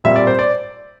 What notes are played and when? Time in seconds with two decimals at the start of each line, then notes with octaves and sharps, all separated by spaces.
0.04 A#2 G3 C4 E5
0.16 D5
0.27 C5
0.39 D5